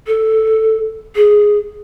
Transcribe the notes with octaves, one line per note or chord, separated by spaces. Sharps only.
A4
G#4